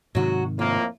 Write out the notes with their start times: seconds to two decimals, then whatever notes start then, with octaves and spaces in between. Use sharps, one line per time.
0.15 G#2 C3 D#3 F#3 F#4
0.59 F2 A2 A#3 F4